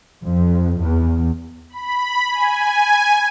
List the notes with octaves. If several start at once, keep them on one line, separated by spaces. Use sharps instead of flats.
F2
E2
B5
G#5